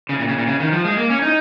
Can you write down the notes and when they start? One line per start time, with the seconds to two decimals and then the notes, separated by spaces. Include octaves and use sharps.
0.09 C#3
0.20 A#2
0.29 C#3
0.38 A#2
0.47 C#3
0.60 D#3
0.72 F3
0.85 G#3
0.97 A#3
1.10 C#4
1.22 D#4